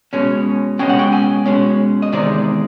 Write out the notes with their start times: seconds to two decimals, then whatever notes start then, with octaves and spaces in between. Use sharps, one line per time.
0.13 B2 G#3 C#4
0.79 B2 G#3 C#4 G5
0.89 F#5
0.99 G5
1.13 G#5
1.46 B2 G#3 C#4
2.02 D#5
2.12 E2 C3 D#3 G#3 D5